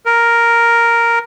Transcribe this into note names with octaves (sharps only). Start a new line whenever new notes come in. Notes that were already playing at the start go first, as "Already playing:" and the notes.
A#4